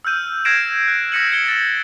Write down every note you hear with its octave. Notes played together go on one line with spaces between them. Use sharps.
E6 F6 G6 D#7
F6 G#6 A#6 C7 D7 E7
F#6
E6 A#6 B6 C#7 D#7 F#7
G#6 C#7 G7
A6 E7